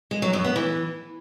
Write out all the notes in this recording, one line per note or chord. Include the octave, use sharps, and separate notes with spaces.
G#3
F#3
F#2
B3
E3